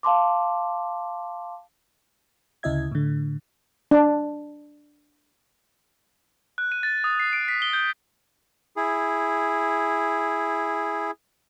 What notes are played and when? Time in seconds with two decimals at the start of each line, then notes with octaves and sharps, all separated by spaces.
0.03 F5 A5 C6 D6
2.63 D2 C#3 E4 D#5 E5 G#6
2.92 A2 D3
3.91 D4
6.58 F#6
6.72 D#7
6.83 A6
7.04 D#6
7.20 C7
7.33 D7
7.48 B6
7.62 G7
7.73 G6
8.76 E4 G#4